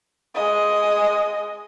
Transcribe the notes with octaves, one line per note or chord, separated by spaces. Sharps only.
G#3 D#5